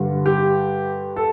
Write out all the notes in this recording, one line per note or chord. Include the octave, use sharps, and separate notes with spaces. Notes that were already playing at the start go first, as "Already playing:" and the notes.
Already playing: G2 D3 G3
G4
A4